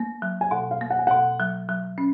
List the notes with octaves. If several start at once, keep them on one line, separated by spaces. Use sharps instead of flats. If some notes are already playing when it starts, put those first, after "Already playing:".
Already playing: A#3
F#3
G#5
B2 F#5
F5
A#3
F#5
G#5
B2 F#5
F#3
F#3
C#4